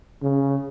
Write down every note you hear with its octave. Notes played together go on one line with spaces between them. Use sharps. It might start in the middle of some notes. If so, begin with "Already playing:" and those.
C#3